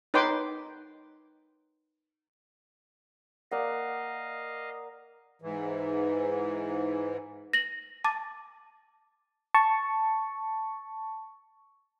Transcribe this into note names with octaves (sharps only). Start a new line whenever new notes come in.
D#4 B4 C#5 G5 C6 D6
A#3 D5 D#5 F5 F#5
G#2 E3
A#6 F#7
A5 D6 A6
A5 C#6